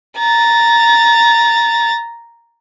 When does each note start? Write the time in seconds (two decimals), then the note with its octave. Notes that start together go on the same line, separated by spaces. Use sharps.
0.18 A#5 A6